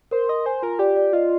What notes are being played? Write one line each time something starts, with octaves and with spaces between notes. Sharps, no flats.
A#4 C5
D#5 C6
C5 G#5
F4 A#4
G4 D5
D5
F4 D#5